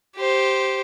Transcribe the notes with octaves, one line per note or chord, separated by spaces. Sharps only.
G4 C5